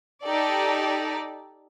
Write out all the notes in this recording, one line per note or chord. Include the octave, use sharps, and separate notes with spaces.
D#4 G4 A4 D5